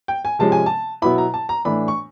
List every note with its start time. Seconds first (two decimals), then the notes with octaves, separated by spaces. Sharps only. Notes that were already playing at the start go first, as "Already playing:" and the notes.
0.08 G5
0.25 G#5
0.39 C3 F3 G#3 C#4 A5
0.52 G#5
0.66 A5
1.02 B2 F#3 B3 E4 B5
1.18 A#5
1.34 A5
1.49 A#5
1.65 A2 E3 A3 D4 B5
1.88 C#6